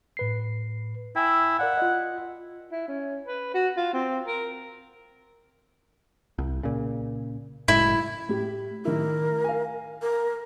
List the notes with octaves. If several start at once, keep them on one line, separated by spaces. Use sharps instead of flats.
A2 B4 C7
E4 G5 G#5 E6
A#4 D5 F5 F#5
F4 D#5
E4
C#4
B4
F#4
F4
C4
A#4
C2
A#2 C#3
F#1 A2 G#3 E4
A2 G4
A2 D#3 E4 A#4
F5 G#5
A#4